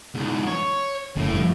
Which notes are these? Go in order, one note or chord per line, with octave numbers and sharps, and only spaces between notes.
E2 G#2
C#5
F#1 A2
G2 D3 F3